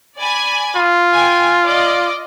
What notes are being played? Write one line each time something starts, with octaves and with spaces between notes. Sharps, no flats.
D5 G#5 B5
F4
G5 G#5
D5 D#5